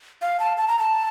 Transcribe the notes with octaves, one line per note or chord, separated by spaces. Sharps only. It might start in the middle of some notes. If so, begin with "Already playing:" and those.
F5
A5
A5
A#5
A5